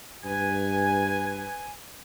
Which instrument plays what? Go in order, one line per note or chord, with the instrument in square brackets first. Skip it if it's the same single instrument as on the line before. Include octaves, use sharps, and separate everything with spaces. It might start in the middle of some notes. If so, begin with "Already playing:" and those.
[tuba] G2 [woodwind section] B4 G#5